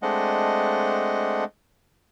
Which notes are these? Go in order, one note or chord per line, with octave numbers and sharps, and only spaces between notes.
G#3 A3 C4 D4 D#5 F#5